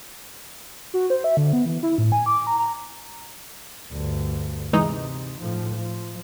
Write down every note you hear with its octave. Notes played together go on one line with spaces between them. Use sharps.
F#4
C5
E5
D3
B3
E3
E4
A2
G#5
D6
A#5
A#5
D2 G2
C3 E3 G#3 D#4
A2 F3
F3